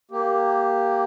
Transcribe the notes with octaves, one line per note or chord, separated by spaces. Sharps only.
A#3 G4